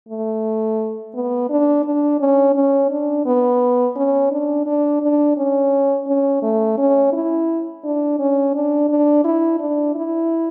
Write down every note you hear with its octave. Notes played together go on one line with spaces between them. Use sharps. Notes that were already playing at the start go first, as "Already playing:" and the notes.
A3
B3
D4
D4
C#4
C#4
D4
B3
C#4
D4
D4
D4
C#4
C#4
A3
C#4
E4
D4
C#4
D4
D4
E4
D4
E4